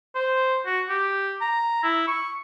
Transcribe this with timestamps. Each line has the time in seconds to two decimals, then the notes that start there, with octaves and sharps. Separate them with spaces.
0.15 C5
0.66 F#4
0.89 G4
1.41 A#5
1.83 E4
2.07 C#6